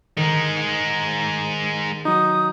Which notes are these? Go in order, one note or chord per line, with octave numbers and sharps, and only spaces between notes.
D#3 G#3 D#4
F#3 D#4 D#6